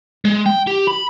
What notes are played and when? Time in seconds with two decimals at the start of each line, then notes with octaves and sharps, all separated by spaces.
0.25 G#3
0.46 G5
0.67 G4
0.87 B5